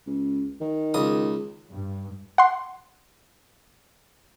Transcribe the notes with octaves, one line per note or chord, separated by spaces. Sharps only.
C#2
D#3
C#2 D#6
G2
F#5 C6